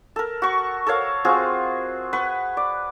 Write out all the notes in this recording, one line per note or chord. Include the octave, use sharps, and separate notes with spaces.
A4 A#4
F#4 C#6
A4 A#4 C#5 F5
C4 F4 F#4 G#4
B4 F#5 C#6
D5